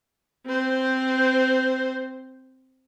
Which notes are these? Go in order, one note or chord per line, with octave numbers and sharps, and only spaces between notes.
C4 C5